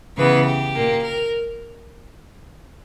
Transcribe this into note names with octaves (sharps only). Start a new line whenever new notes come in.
C#3 E3 B3 B4
G4
A#2 A#3
A#4